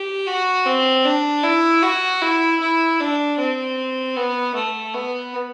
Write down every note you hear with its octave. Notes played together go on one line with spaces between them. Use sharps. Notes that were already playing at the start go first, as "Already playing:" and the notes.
Already playing: G4
F#4
C4
D4
E4
F#4
E4
E4
D4
C4
B3
A3
B3